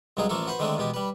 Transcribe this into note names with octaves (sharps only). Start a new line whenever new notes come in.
C2 G2 F#3 G#3 D#4 G#4
A1 F3 A3 A#3 A4
F#4 B4 C5
D3 D#3 G#3 A3 C4 D4
E2 B2 G#3 G4
G3 B4